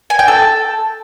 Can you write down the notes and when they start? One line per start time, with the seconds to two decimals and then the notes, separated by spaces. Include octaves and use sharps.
0.10 G#5
0.19 G5
0.28 A4